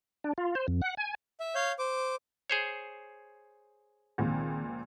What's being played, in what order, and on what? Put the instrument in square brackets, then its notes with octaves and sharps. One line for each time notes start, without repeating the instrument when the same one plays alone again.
[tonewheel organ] D4
F4
C5
F2
F#5
G#5
[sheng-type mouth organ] E5
C#5 F5 G6
C5 D6
[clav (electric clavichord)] G#4 C5 C#5
[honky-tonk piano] C#2 A#2 F3 [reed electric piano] D#3 C4